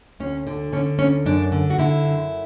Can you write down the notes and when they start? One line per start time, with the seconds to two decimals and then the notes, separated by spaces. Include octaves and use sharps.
0.20 D2 C#4
0.47 D3
0.73 D3 C#4
0.99 D2 C#4
1.26 F#2 D4
1.52 D3
1.70 F#4
1.79 D3 E4
2.05 F#2